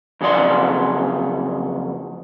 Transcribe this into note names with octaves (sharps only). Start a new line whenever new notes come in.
F2 C#3 F#3 D5 C6